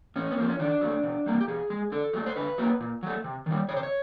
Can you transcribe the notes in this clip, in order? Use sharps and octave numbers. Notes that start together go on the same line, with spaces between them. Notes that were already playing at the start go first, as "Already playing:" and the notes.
A2 C#4
B3
F3 A#3 C4
C#4
D#3 D4
F#3 A3
B2
G3 A#3
G4
B2 G#4
G#3
D3 A4
F#3 A3
C5
D3 B4
F#3 A#3
A#2
F#3 A3
C3
D#3 G3
C3 C#5
C5
C#5